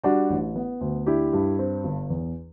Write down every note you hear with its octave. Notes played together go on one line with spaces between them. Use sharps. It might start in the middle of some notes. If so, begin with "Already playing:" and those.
G3 D4 F#4
A1
B3
D2
D4 E4 G4
G2
C4
G1
E2